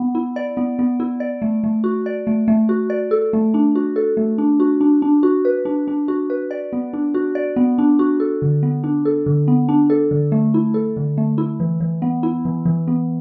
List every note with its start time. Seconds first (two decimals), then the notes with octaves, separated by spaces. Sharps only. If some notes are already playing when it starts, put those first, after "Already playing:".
Already playing: B3
0.15 E4
0.36 D5
0.57 B3
0.79 B3
1.00 E4
1.20 D5
1.42 A3
1.64 A3
1.84 F#4
2.06 D5
2.27 A3
2.48 A3
2.69 F#4
2.90 D5
3.11 A4
3.33 A3
3.54 D4
3.75 F#4
3.96 A4
4.17 A3
4.38 D4
4.60 F#4
4.81 D4
5.02 D4
5.23 F#4
5.45 B4
5.65 D4
5.88 D4
6.08 F#4
6.30 B4
6.51 D5
6.73 B3
6.93 D4
7.14 F#4
7.35 D5
7.56 B3
7.78 D4
7.99 F#4
8.20 A4
8.42 D3
8.63 B3
8.84 D4
9.05 A4
9.26 D3
9.48 B3
9.69 D4
9.90 A4
10.11 D3
10.32 A3
10.54 E4
10.74 A4
10.97 D3
11.18 A3
11.38 E4
11.60 E3
11.80 E3
12.02 B3
12.23 E4
12.45 E3
12.65 E3
12.88 B3